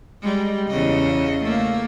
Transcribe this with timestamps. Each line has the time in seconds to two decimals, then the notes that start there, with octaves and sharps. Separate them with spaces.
0.23 G3 G#3
0.69 E2 C#3 D#5
1.42 A3 A#3